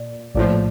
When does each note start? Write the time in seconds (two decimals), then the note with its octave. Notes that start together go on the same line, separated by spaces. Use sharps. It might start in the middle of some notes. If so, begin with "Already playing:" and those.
Already playing: A#2 D5
0.35 A#1 A2 F3 D5